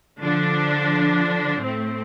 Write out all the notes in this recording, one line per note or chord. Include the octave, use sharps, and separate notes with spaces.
D3 F3 D4
A2 A3 C4